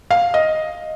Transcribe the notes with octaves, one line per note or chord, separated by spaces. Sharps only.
F5
D#5